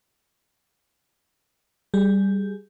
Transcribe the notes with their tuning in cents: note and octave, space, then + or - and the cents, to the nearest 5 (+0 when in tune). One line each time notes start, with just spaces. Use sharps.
G3 +0 G#4 +10